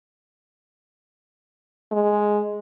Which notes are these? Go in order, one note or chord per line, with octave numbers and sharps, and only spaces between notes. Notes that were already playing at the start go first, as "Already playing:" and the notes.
G#3